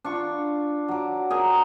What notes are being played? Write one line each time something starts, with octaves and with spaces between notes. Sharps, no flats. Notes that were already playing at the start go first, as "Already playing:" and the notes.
D4 F4 C#6
F#3 D6
G#4 A#4 G5